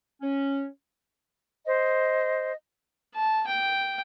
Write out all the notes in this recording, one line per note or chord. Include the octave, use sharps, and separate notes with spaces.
C#4
C5 D#5
A5
G5